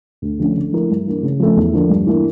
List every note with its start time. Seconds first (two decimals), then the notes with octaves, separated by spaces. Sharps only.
0.22 D2
0.39 D3 F3 A3 C#4
0.56 D3
0.72 F3 A3 E4 A#4
0.90 G2
1.06 E3 A#3 D4
1.23 C#3
1.40 F3 A3 C#4
1.57 E2
1.74 D3 F3 A#3 D4
1.90 G2
2.06 E3 A#3 D4